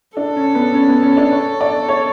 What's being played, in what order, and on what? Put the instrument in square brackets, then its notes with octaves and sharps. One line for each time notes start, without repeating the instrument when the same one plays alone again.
[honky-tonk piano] D4 [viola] A4
[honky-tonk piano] C#4
B3
C#4
B3
C#4
D4
C#5
D5
C#5